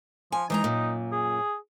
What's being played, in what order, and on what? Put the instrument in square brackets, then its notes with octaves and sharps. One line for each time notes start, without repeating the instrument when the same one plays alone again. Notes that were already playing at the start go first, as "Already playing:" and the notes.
[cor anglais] F3 [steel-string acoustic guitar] G#5
[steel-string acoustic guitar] E3 G#3 A#5 [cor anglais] D#4
[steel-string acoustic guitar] F#2 A#2
[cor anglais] G#4